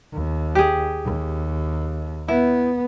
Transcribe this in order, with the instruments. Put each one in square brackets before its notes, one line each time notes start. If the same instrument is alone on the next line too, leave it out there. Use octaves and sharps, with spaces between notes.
[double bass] D#2
[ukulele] G4 G#4
[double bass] D#2
[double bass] B3 [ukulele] E4